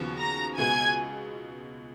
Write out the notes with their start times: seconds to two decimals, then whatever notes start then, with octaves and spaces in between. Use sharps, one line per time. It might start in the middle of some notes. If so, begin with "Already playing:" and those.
Already playing: D#2 C#3 F3 B3 F#4
0.19 A#5 A#6
0.57 C#2 B2 G#3 B3 F#4 G#5 G#6